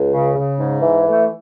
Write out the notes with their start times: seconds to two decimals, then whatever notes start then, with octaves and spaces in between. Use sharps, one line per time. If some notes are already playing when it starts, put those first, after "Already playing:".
Already playing: C#2
0.12 C#3
0.35 C#3
0.59 G#2
0.82 E3
1.06 A3